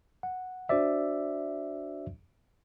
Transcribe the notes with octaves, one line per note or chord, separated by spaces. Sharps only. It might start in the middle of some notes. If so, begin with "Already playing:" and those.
F#5
D4 F#4 C5 D5 E5